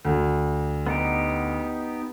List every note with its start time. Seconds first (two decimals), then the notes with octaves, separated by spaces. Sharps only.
0.05 D2
0.87 B3 D#4 G4